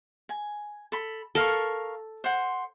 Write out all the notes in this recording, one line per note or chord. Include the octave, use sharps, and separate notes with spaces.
G#5
A4 B5
A4 A#4 F5 C#6
C5 F#5